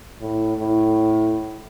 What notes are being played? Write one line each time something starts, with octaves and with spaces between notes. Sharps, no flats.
A2
A2